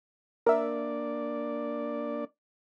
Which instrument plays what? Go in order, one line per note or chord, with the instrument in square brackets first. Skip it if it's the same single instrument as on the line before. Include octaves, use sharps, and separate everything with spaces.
[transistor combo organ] A#3 D4 D5 [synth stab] A#4 E5